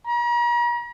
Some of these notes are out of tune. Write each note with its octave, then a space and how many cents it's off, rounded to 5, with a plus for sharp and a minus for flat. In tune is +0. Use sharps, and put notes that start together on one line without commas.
A#5 +40